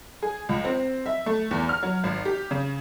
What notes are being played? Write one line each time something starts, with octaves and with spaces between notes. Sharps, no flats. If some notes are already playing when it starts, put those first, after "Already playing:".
G#4
C#2
C4
E5
A3
E2
F6
F#3
G#1
G4
C#3